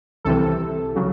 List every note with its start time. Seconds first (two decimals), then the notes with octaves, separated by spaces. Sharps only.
0.25 C2 C3 E3 A4
0.95 C#3 F#3